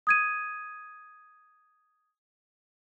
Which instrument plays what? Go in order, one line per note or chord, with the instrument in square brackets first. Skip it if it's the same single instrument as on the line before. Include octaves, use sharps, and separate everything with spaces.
[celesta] D#6 G#6 D#7